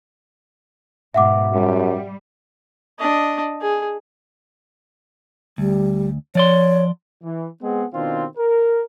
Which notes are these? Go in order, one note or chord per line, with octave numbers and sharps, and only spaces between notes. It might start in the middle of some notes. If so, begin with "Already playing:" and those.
G#2 B2 E5 F#5 D6
F#2 G3
D4 D#5
G#4
D2 G3
F3 C#5 D5 C6
E3
G#3 B3 C4 G#4 F#5
B2 D#3 C4 D4 F4
A#4